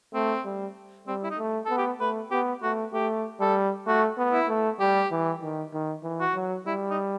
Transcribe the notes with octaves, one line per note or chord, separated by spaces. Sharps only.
A3 C4
G3
G3 C4
E4
D#4
A3
B3 A4
G4
A3 B4
B3 G4
A3 F#4
A3 G4
G3 A4
A3 F#4
B3
E4
A3
G3 G4
E3
D#3
D#3
E3
F#4
F#3
G3 E4
D#4